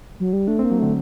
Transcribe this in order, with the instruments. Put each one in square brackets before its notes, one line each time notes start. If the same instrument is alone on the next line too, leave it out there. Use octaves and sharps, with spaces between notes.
[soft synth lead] F#3
G3
[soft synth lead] A3 [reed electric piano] D4
[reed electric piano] C4
[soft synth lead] A#3
[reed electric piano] F#3
[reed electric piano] D3 [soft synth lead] A3